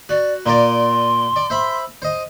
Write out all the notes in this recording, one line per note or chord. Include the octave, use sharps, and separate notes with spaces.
F#4 D5
A#2 A#4 D5 C6
D5
C5 E5 B5
C5 D#5